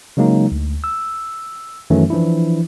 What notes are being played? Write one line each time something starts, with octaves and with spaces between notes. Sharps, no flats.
C#3 F#3 G#3 A#3 D#4
D2
E6
F#2 D#3 E3 F#3 A3 C#4
E3 F3 D4 E4